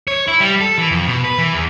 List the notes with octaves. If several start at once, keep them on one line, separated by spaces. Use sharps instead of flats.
C#5
E4
G3
A4
E3
F2
B2
B4
E3
E2